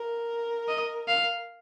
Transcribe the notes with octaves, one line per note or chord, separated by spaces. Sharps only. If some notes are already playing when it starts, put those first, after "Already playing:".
Already playing: A#4
D#5
F5